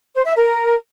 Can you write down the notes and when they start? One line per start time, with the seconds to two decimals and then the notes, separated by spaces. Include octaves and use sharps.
0.15 C5
0.25 E5
0.35 A#4